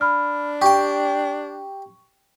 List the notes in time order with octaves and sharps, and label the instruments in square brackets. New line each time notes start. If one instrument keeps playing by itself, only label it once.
[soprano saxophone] D4 [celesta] B5 F6
[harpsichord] G4 G5 [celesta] C#6